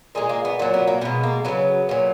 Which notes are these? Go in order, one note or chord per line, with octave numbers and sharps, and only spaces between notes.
A#2 G#3 G#4
A#3
B3
A#2 F#3
B3
A#3
B2 G#3 B3
A#3
C#3 F#3 B3
A#2 F#3